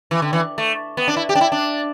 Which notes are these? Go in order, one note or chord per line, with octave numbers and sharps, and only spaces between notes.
E3
D3
E3
A3
B3
D4
E4
G4
D4
E4
D4